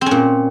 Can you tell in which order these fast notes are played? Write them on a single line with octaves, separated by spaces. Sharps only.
C4 C#4 A#2